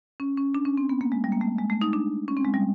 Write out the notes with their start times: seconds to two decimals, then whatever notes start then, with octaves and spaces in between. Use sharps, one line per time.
0.20 C#4
0.37 C#4
0.55 D4
0.65 C#4
0.77 C4
0.89 B3
1.01 A#3
1.12 G#3
1.24 G3
1.32 A#3
1.41 A3
1.59 G#3
1.70 A3
1.81 D#4
1.93 D4
2.28 C#4
2.37 C4
2.45 G#3
2.54 G3